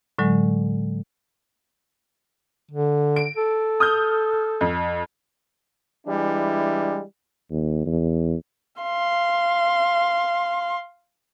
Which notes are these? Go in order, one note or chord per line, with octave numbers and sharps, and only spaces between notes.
A2 D3 F#3 G#3
D3
D7
A4
D#6 F6 G6
F2
E3 G3 G#3 D4 E4
D#2
E2
F5 C6